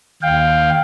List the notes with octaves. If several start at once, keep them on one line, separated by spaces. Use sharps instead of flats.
D#2 F5 G5